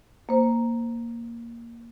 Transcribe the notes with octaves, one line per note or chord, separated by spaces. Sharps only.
A#3 C5